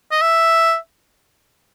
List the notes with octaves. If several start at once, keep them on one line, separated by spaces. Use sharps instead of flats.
D#5
E5